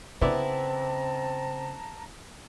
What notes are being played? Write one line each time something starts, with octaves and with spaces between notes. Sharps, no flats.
C#3 B3 C4 E4 D5 A5 A#5